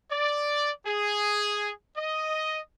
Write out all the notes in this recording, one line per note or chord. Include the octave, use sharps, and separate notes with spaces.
D5
G#4
D#5